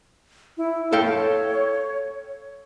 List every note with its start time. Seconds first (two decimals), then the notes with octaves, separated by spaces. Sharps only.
0.57 E4
0.93 A4 C#5 F5 G5